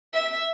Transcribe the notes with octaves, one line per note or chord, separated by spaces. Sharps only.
E5